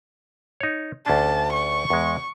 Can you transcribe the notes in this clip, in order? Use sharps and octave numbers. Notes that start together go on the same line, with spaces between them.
D#4 C#5
D2 C#4 D4 A5
C#6
E2 G#3